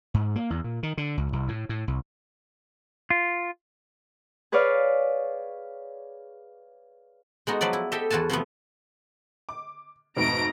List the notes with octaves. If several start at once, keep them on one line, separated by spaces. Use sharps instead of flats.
G#2
A#3
E2
A#2
D#3
D3
C#2
C2
A2
A2
C2
F4
G#4 B4 C#5 D5 F5
G#3 B3 D#4 F#4
F3 F#3 B4 D5
E4
G4 A4 D#5 E5
E2 F4 F#4 G#5 A5
C3 F3 A3 B3
D6
F2 G#2 B2 A3 A#5 A#6 D7